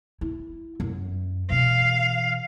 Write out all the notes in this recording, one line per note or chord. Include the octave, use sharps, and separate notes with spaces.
E4
F#2
B2 E3 F5